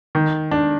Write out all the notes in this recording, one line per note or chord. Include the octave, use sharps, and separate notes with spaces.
D#3
D4